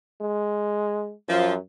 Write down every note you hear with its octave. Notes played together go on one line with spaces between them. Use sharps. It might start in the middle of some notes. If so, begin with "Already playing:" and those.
G#3
F#2 F3